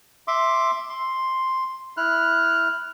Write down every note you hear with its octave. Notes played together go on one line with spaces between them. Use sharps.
E5 C6 D6
C6
E4 F6 F#6